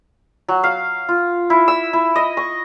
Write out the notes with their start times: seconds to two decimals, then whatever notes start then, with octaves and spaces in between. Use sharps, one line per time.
0.48 F#3
0.64 F5
1.09 F4
1.50 E4
1.68 E6
1.93 E4
2.16 D#5
2.37 C#6